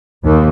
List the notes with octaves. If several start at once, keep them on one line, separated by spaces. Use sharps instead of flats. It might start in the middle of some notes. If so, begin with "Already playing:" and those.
D#2